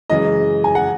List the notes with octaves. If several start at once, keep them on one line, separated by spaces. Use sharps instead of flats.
F#2 C#3 E3 G#3 D#5
G#5
F#5